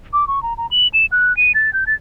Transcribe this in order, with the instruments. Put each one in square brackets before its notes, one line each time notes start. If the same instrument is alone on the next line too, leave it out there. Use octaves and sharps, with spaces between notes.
[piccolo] D6
C#6
A#5
A#5
F#7
E7
F#6
D#7
A6
G6
A6